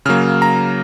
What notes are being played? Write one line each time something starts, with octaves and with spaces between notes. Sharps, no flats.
C#3 F#3 A#3 F6
A#5